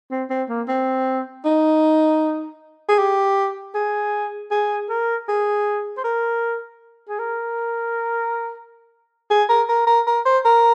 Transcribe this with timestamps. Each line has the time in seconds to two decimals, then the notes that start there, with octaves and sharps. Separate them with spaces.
0.11 C4
0.30 C4
0.49 A#3
0.68 C4
1.45 D#4
2.89 G#4
2.98 G4
3.75 G#4
4.51 G#4
4.89 A#4
5.28 G#4
5.97 C5
6.04 A#4
7.08 G#4
7.19 A#4
9.30 G#4
9.49 A#4
9.69 A#4
9.87 A#4
10.07 A#4
10.25 C5
10.45 A#4